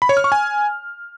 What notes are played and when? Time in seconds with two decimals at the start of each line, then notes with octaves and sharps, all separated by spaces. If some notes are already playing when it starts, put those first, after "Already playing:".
0.02 B5
0.09 C#5
0.17 F6
0.24 C#6
0.32 G#5